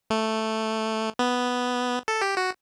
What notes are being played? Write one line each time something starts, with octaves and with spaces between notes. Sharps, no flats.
A3
B3
A4
G4
F#4